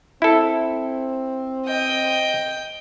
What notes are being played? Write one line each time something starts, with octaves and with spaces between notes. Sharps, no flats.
C4 E4 A4
D#5 G5